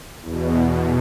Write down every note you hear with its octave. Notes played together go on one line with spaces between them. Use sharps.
E2 B2